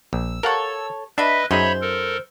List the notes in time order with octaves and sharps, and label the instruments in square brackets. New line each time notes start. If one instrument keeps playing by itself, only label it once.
[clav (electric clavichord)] A#1 [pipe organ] E6
[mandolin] A4 C#5 [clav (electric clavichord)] A#4 F5 F#5
[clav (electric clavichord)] D4 [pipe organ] B4 D#5 [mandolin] E5 B5
[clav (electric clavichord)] F#2 D#4 G#4 [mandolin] C5 [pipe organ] C#5 E5 B5
[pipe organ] A4 A#4